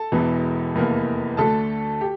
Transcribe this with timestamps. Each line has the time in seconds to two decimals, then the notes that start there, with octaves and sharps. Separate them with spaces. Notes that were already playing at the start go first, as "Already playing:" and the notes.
Already playing: A4 A5
0.12 E1 E2 E3
0.75 F1 E2 E3 A#3
1.37 D2 D3 A3 A4 A5
2.01 G4